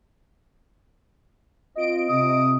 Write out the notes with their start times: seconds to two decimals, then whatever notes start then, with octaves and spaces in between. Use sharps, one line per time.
1.76 C4 F4 D#5 D7
2.09 C3 D#6